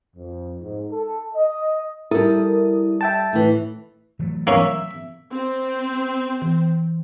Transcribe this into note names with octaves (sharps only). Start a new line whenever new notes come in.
F2
G#2
A4
D#5
G3 E4 A4 A#4 D#6
E5 G5 A5
A2 E3
E3 F#3 A3
A#3 C#4 E5
C4
E3